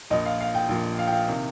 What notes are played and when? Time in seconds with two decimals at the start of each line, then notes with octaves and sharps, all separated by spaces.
0.10 A#1 A#2 F3 D#5
0.26 F5
0.40 F5
0.55 G5
0.69 A#1 A#2 F3
0.98 F5
1.07 G5
1.12 F5
1.28 C3 D#3